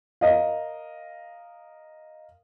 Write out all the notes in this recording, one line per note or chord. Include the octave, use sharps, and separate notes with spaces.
A#4 D#5 F5